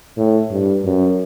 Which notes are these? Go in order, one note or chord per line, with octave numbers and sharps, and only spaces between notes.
A2
G2
F#2